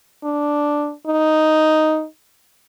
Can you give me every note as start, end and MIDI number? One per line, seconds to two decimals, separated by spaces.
0.24 0.92 62
1.06 2.05 63